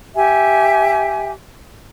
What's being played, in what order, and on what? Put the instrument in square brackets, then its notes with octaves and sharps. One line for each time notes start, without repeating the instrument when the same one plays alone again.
[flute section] G4 E5 G#5